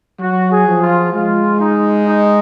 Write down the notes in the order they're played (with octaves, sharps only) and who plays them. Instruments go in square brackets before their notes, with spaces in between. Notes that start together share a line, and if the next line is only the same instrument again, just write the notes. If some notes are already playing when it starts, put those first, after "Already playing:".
[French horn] F#3 [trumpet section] F#4
[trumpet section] G#4
[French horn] F3
[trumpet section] F4
[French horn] G#3 [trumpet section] F4
[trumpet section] D#4
D#4